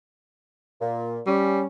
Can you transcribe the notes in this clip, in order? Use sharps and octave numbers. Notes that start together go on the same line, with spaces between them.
A#2
G3 C#4